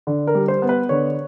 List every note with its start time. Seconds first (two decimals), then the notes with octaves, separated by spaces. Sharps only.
0.07 D3
0.27 A#4
0.35 G3
0.48 C5
0.62 B3
0.69 B4
0.89 D3 C#5